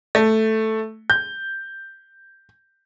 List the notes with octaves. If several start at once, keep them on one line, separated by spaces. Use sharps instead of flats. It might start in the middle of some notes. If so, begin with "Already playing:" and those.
A3
G6